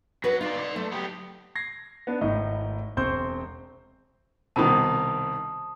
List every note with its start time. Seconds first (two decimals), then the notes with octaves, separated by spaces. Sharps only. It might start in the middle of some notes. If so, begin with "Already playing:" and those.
0.24 F#3 D4 F#4 B4
0.41 D4 D#4 F4 D5
0.58 D5 C6
0.76 F#3 A3
0.92 B3 G4
1.55 G#6 A#6 C7
2.07 B3 D4
2.21 G#1 A2 D#4 D#5
2.97 E1 C4 C5 C6 C#6 G6
4.56 C2 B2 D#3 A5 D#6